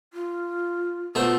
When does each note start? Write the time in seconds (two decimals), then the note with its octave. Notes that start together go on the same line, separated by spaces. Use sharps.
0.13 F4
1.15 B2 A3 F4 C5